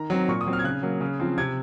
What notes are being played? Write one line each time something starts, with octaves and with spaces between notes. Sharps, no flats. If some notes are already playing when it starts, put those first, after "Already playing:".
Already playing: D#3 A#5
F#3 C4
A#2 C#6
D#6
F#3 C4
F6
G#6
C#3 F#6
F#3 A#3
C#3
F3 C4
C3 G#6